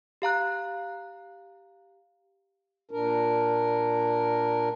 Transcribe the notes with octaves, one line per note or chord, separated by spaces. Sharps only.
G4 F5 A#5 F#6
A#2 D4 A#4